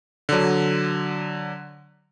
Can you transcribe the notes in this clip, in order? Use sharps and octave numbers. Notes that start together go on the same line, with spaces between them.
D3 F#3